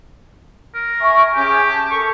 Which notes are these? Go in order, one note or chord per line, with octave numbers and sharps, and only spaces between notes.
A#4
E5 G#5 C#6
C#4 G4 G#4 G#5
A5
A4 A#4 C#6